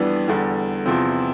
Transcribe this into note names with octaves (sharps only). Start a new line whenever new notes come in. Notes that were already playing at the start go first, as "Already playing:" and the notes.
Already playing: F2 E3 G3 B3 D4
E2 D3 G3
E2 C3 F3 C4